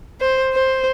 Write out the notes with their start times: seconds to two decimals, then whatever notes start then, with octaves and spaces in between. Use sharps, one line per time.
0.21 C5
0.53 C5